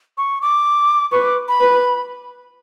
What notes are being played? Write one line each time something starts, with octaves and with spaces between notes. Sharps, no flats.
C#6
D6
B4 C#6
D6
B5
B4